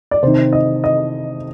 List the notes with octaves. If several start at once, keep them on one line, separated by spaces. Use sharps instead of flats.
D5
C3 D#3 C5
D#5
D#5